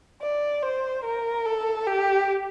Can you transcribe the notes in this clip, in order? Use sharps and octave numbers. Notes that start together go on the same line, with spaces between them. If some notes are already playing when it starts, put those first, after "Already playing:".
D5
C5
A#4
A4
G4